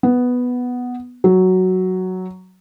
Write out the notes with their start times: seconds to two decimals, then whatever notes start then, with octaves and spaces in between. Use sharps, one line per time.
0.03 B3
1.24 F#3